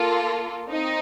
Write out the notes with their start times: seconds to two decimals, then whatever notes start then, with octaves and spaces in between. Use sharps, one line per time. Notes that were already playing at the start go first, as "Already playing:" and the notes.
Already playing: A#3 F4 A4
0.70 C4 D#4